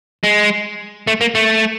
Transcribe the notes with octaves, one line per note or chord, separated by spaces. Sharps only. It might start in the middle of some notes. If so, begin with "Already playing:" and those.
G#3
A3
A#3
A3